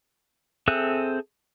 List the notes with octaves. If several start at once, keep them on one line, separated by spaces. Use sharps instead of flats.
C4 G#4 A4 E5 F#6